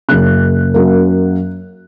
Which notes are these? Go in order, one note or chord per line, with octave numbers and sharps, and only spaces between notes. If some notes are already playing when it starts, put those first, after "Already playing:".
F#1 F#2 C#3 F#6
F#2 F#3 A#3